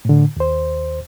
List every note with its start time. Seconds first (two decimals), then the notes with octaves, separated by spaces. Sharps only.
0.05 A2 D3
0.37 D#2 C5